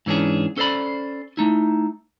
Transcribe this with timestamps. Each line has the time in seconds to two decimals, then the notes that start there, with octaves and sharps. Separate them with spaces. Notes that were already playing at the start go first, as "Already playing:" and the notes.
0.06 G#2 E3 C#4 D4 G#4
0.57 C#4 A4 B4 C5 D5 B5
1.37 A3 D#4 E4